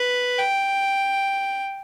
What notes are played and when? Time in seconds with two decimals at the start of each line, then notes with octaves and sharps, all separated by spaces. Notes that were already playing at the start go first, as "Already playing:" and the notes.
Already playing: B4
0.39 G5